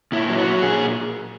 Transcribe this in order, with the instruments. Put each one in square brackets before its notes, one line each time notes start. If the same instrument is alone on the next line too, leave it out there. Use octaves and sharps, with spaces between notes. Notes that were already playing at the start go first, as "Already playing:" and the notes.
[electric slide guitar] A#2 E4
F#3
F#4
F#3
A#2 G#4